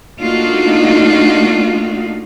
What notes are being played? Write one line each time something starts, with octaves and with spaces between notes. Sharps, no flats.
A3 A#3 D4 D#4 F4 F#4